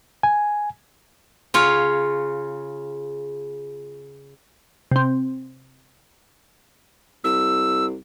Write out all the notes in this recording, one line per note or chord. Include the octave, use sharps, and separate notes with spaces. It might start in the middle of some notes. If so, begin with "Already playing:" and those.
G#5
C#3 F4 C#5
C3 C4
C2 E6